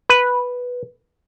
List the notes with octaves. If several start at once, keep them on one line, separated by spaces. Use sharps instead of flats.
B4